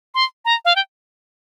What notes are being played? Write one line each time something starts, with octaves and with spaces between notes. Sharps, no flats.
C6
A#5
F5
G5